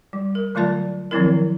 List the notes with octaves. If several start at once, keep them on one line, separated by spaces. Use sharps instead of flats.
G3
A#4
D3 F#3 A3 F4 D5 A5
D#3 F3 F#3 C4 E4 A#4